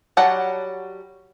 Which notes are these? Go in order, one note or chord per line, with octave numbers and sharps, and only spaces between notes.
F#3 G3 F#5 A5